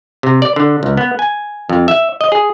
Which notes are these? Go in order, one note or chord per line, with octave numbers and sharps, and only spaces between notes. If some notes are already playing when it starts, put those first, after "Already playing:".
C3
D5
D3
C#2
B3
G#5
F2
E5
D#5
G#4